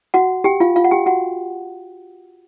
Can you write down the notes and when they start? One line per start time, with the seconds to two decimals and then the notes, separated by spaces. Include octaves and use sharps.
0.14 F#4 F#5
0.44 G4 G5
0.60 F4 F5
0.76 F4 F5
0.84 F#5
0.91 G4 G5
1.06 F#4 F#5